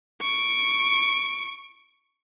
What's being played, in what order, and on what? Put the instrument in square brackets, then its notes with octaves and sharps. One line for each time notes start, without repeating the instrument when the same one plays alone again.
[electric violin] C#6 D7